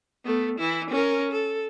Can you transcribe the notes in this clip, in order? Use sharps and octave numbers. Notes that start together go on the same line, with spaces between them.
A3 B3
E3 E4
C#4 A#4
A4